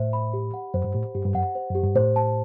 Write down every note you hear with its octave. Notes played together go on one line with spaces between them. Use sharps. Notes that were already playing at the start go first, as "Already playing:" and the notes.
Already playing: A2 C5 E5
B5
G4
F#5
F#2 C5
G2
A2 G4
G2 G4
G2
F#2 F#5
C5
F#2 G4
G2
A2 C5
A5